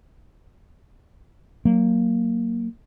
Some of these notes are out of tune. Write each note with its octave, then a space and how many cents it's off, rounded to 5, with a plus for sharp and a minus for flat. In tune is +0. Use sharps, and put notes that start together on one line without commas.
F#3 +0 A#3 -10